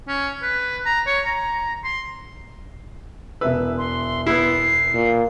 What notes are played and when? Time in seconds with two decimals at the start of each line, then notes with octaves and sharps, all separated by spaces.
0.08 C#4
0.42 B4
0.86 A#5
1.07 C#5
1.25 A#5
1.84 C6
3.41 E1 B4 E5 E6
3.78 C6
4.27 B3 E4 C7
4.94 A#2